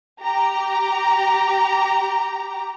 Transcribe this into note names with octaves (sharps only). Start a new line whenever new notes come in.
G4 A#5